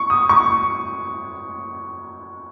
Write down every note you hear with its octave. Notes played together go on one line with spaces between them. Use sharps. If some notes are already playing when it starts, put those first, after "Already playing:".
Already playing: C#6
D#6
C#6